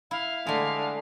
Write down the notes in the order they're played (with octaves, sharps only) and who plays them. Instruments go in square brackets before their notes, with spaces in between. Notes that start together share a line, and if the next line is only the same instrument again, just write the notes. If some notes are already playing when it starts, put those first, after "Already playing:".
[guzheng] E4 [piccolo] F5
[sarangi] D3 [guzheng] G#3 A3